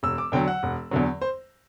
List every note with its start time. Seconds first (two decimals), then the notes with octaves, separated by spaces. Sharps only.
0.03 E1 E6
0.18 D6
0.32 E2 D3 F#3 G5
0.48 F#5
0.63 E1
0.91 E2 D3 F#3
1.22 C5